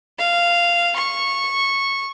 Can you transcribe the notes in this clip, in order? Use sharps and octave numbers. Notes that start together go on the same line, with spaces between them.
F5
C#6